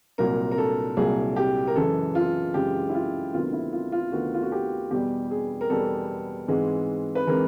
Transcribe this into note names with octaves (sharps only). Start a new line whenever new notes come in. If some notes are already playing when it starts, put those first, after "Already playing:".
C2 A#2 F#3 A#3 A#4
A#4
A4
C2 A#2 F#3 A#3 G#4
G4
A#4
F#2 C#3 E3 G#3 A4
F4
F#2 C#3 E3 G#3 G4
E4
F4
D2 C3 D#3 F#3 B3 F4
E4
F4
F4
D2 C3 D#3 F#3 B3 F#4
F4
F#4
G4
E2 B2 G3 B3 G4
G#4
A#4
E2 B2 G3 B3 A4
G#2 E3 G#3 C4
B4
E3 G#3 C4 A#4